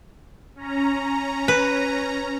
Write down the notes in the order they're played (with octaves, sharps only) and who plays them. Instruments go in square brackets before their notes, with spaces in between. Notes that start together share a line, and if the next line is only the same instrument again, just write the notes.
[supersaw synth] C#4 A#5
[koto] B4